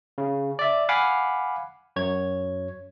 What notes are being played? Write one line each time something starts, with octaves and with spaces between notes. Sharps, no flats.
C#3
D5 E5
F5 F#5 G#5 B5 D6
F#2 C#5 G#6